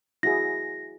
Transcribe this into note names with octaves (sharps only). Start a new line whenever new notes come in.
E4 F#4 G#4 A#6